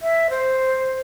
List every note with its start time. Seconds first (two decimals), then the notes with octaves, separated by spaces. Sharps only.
0.01 E5
0.30 C5